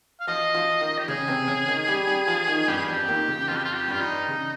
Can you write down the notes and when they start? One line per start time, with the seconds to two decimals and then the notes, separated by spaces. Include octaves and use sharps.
0.20 F5
0.27 F3 F4 D#5
0.54 F3 F4
0.81 D#3 D#4
0.98 G4
1.08 C#3 C#4 G#4
1.28 C3 C4
1.48 C#3 C#4
1.68 D#3 D#4
1.88 G3 G4
2.07 G3 G4
2.28 F3 F4
2.47 D#3 D#4
2.68 G2 G3 G4
2.77 G#4
2.86 F2 F3 G4
3.08 D#2 D#3
3.28 C#3
3.48 F2 F3 F4
3.57 G4
3.64 F4
3.75 G4
3.88 G2 G3 F4
4.01 D#4
4.28 C#3